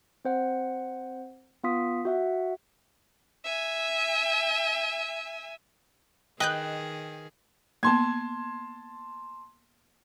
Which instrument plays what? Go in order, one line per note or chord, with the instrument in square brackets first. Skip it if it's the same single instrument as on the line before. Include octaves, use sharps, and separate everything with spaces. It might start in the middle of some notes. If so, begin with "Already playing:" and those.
[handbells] C4 C5 F#5
B3 F4 F5 C6 D#6 B6
F#4 E5 F#5
[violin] E5 G#5
[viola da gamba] D#3 G#4 [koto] B4 [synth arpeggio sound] D#5 F#6 G6 [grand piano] G5
[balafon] A#3 B3 [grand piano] A5 C6 G#6